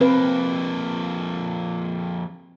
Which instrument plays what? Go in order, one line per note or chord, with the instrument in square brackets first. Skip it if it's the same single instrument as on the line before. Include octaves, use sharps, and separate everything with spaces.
[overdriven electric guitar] F2 A#3 [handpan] C4 B4